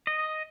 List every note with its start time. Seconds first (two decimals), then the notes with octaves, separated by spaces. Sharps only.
0.07 D#5